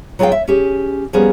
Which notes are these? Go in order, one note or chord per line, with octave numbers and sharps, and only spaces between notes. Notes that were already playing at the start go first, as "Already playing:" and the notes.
F#3 F4 G#4 A4 F5 G5
E5
C#4 G4 G#4
F3 G3 A#3 B3 C#4 G#4